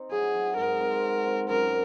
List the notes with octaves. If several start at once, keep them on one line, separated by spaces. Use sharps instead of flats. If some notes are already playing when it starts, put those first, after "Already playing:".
Already playing: C4 D#4
F#3 G#4
F#3
G#2 A#4
C4
F#4
C4
F#2 A#4